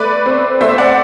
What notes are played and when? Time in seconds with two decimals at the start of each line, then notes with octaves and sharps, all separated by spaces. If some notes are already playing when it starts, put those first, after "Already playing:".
Already playing: A3 B4 D5
0.26 C4
0.61 A3 C5 E5
0.78 D5 F#5